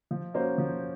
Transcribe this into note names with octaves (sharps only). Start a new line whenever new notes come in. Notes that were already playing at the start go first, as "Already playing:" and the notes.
F3
A#3 C#4 F#4 C5
F3